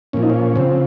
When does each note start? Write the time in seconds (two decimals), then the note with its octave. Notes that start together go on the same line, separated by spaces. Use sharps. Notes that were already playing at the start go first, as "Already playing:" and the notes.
0.13 A#2 F3 C#4
0.22 D#4
0.30 C#4
0.55 C#3 F3 C4